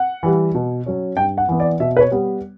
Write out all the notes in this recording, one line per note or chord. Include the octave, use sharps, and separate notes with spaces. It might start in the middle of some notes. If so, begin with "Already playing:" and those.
Already playing: F#5
E3 G3
B2
F#3 C#4
G2 G5
F#5
E3 B3
D5
B2 E5
B4
C#5
G3 B3